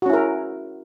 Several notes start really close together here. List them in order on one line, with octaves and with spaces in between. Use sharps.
F#4 C#4 E4 A#4